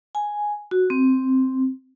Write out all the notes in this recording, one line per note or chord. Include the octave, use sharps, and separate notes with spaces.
G#5
F#4
C4